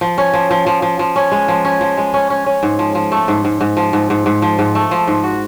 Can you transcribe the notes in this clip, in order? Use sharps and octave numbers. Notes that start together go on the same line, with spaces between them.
F3
C#4
F3
F3
F3
F3
F3
C#4
G#3
F3
C#4
F3
G#3
C#4
C#4
C#4
G#2
F3
F3
A3
G#2
G#2
G#2
F3
G#2
G#2
G#2
F3
G#2
A3
F3
G#2
F#4